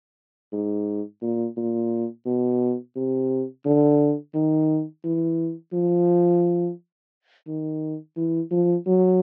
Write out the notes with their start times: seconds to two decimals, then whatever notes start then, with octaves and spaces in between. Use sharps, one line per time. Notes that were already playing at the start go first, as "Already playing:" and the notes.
0.53 G#2
1.22 A#2
1.57 A#2
2.26 B2
2.96 C3
3.66 D3
4.35 D#3
5.04 E3
5.73 F3
7.48 D#3
8.17 E3
8.51 F3
8.87 F#3